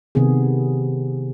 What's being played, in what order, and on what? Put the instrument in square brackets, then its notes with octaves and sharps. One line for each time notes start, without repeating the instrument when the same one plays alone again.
[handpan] C3 D#3 B3 G#4